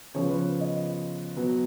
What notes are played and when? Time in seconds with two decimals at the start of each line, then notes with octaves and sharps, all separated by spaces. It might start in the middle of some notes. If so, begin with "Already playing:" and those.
0.14 C#3 F3 B3 C#5
0.29 B4
0.60 D#5
1.36 B2 F#3 B3